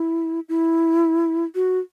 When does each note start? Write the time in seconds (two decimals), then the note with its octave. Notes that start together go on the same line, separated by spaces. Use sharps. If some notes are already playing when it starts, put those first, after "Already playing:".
Already playing: E4
0.49 E4
1.55 F#4